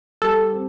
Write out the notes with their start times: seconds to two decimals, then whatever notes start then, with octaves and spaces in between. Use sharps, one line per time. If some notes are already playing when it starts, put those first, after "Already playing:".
0.22 G3 A4
0.53 C4